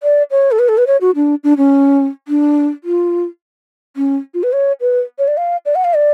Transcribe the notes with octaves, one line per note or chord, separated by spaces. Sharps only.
D5
C#5
A4
B4
A4
B4
C#5
F#4
D4
D4
C#4
D4
F4
C#4
F4
B4
C#5
B4
C#5
D5
F5
D5
F#5
F5
D5